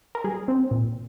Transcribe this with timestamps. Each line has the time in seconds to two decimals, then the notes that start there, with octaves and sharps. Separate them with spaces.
0.15 A#4
0.24 G3 G#4
0.48 C4
0.71 A#2